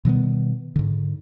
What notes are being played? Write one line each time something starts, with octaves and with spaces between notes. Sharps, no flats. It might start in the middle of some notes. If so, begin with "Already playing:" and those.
B2 D#3 G3 B3
G#2 D3